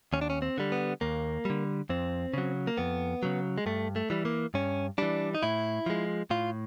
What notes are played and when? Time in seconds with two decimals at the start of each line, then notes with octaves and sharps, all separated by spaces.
0.13 D#2 C#4
0.21 D4
0.30 C#4
0.42 C4
0.58 D3 G3
0.72 B3
1.01 D#2 A#3
1.45 D3 G3
1.89 F2 C4
2.34 C#3 F#3
2.67 A#3
2.77 F2 B3
3.23 C#3 F#3
3.58 G#3
3.66 G2 A3
3.96 A3
4.10 E3 G3
4.25 A#3
4.54 G2 C#4
4.98 E3 G3 D4
5.35 D#4
5.43 A2 E4
5.86 F3 G#3
6.30 A2 F4